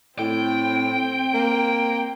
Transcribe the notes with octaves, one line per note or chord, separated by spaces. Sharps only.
A2 C4 G5
A#3